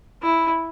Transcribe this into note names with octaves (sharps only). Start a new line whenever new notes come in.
E4